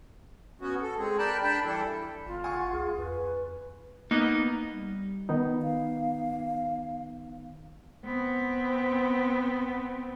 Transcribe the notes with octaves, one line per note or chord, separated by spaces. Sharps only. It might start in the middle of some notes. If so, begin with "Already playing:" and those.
B3 C#4 F#4
A4
G#3 C4 G#4
A#4 D5 G5 A5 B5 F#6
D4 G5 A5 B5
E3 G3 D4 E4 A4
G1 F4
F#5 G#5 C#6
C#2 G#4
F2 B4
A#3 B3 D#4
G3
D#3 B3 D#4
F5
B3 C4